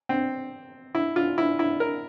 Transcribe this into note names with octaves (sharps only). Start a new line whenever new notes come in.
C4
E4
F4
E4
E4
A#4